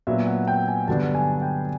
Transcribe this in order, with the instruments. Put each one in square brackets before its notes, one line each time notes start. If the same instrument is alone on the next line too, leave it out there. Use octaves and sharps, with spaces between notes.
[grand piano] A#2 F#3 B3 D4 E5
F#5
G5
G#5
G2 D3 F#3 B3 D4 A5
G#5
G5